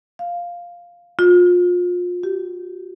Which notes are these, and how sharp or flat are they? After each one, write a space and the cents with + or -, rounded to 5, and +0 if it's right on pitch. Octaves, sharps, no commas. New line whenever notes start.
F5 +0
F4 +30
G4 -25